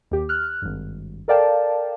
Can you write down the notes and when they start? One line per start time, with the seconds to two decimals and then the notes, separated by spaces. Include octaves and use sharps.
0.11 D#2 G4
0.29 F6 F#6
0.62 G#1 G2
1.28 A4 A#4 D5 F5 G5 A5